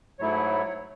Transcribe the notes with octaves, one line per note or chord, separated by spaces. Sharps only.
G#2 F#3 A3 E4 C#5